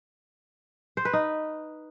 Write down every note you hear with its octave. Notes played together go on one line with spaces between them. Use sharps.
C5
B4
D#4